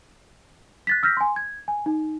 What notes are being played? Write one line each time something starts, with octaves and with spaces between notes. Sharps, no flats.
F#6 A6 B6
E6 F6 G6 A#6 B6
G#5 C6
G#6
G#5
D#4